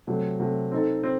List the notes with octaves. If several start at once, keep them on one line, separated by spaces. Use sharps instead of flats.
C3 F#3 A3
C3 F#3 A3
C4 D#4 A4
C4